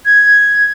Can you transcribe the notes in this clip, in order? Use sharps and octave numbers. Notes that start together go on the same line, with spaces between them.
G#6